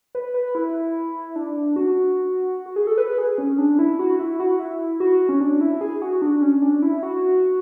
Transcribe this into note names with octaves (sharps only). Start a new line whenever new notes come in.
B4
B4
E4
D4
F#4
F#4
G#4
A4
B4
G#4
C#4
D4
E4
F#4
E4
F#4
E4
F#4
C#4
D4
E4
G#4
F#4
D4
C#4
D4
E4
F#4